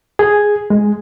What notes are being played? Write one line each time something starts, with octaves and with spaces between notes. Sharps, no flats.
G#4
G#3